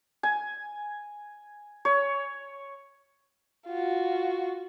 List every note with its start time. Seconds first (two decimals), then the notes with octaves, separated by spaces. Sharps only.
0.23 G#5
1.85 C#5
3.68 F4 F#4